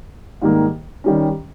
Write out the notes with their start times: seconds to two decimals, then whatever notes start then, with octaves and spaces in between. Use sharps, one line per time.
0.42 G#2 D#3 G3 A#3
1.04 D#3 G3 C#4